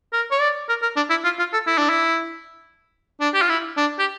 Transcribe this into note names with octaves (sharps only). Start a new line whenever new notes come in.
A#4
C#5
D5
A#4
A#4
D4
E4
F4
F4
A4
E4
D4
E4
D4
G4
F4
E4
D4
G4